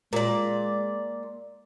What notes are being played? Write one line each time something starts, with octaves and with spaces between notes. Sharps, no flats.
A#2 G#3 D5